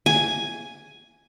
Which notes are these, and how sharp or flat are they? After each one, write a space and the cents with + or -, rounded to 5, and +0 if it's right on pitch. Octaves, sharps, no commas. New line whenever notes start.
G#5 +0